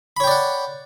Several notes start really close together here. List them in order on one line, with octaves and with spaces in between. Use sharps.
B5 C#5 G5 D5 F#5